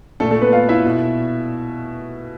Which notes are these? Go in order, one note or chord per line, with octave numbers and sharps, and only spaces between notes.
A#2 A3 A4
A3 A4
B3 B4
F4 F5
E4 E5
B2